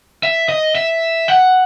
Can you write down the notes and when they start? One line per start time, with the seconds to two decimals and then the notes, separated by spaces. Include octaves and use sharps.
0.23 E5
0.49 D#5
0.75 E5
1.28 F#5